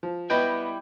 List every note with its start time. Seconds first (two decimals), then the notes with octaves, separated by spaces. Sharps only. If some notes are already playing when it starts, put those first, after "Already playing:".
0.03 F3
0.30 G3 B3 E4 B4 D#5 G5